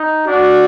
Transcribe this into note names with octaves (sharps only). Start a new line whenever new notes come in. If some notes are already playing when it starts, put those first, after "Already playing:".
Already playing: D#4
D4 F#4